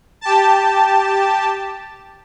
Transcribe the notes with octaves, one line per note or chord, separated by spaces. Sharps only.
G4 A5